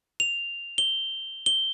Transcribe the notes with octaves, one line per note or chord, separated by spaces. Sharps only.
F7
G7
G7